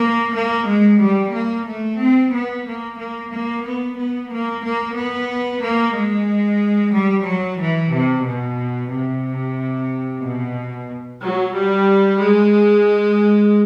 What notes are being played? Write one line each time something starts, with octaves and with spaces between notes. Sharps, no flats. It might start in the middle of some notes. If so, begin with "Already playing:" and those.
Already playing: A#3
A#3
G#3
G3
A#3
A3
C4
B3
A#3
A#3
A#3
B3
B3
A#3
A#3
B3
A#3
G#3
G3
F#3
E3
C3
B2
C3
B2
F#3
G3
G#3